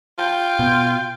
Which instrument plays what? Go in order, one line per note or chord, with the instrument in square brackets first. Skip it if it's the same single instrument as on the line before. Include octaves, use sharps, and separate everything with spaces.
[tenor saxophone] F4 [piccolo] G5
[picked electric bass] B2